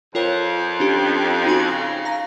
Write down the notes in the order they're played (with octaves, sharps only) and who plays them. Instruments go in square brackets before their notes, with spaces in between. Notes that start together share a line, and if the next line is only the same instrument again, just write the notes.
[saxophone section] F2 [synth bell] F4 A#4 C#5
[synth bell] C#4 D4 G4
D#4 F#4 G#5
[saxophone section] C#3 [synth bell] A#6
[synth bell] F5 A#5 A#6